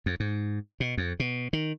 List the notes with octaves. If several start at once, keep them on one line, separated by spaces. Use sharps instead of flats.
F2
G#2
B2
F2
B2
D#3